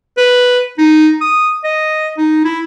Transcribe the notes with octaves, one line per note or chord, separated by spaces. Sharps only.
B4
D#4
D#6
D#5
D#4
E4